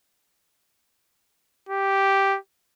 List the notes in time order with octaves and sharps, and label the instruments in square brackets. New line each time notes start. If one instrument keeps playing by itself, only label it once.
[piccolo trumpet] G4